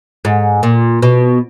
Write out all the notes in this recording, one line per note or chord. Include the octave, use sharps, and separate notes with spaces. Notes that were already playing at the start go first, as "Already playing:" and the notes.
G#2
A#2
B2